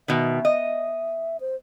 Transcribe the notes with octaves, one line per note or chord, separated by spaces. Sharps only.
B2 D#3 E5
D#5
C5